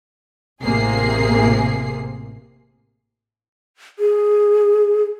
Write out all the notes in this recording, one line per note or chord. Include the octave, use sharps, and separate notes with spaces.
A1 C3 A#3 G#4 C7
G#4